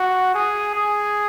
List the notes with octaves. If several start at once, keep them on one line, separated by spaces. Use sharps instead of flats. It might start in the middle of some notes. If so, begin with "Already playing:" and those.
Already playing: F#4
G#4
G#4